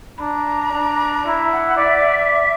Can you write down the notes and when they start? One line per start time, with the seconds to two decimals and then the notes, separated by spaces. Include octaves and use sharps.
0.17 B5
0.20 D4 A#5
0.73 D4
1.25 E4 A#5
1.52 F#5
1.77 D5 E5